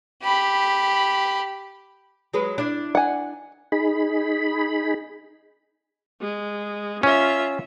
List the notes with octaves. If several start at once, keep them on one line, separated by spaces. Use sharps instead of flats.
G4 B5
F#3 G#3 B4
D4 E4
F#5 G#5
D#4 G#4 B5
G#3
C#4 F4 E5